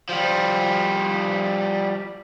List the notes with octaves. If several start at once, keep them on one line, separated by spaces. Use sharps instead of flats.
F3 G3